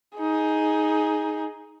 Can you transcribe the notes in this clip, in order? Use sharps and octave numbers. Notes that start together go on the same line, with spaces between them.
D#4 G#4